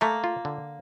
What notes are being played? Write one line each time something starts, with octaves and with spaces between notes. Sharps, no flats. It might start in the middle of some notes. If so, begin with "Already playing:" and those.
A3 A#3
F4
D3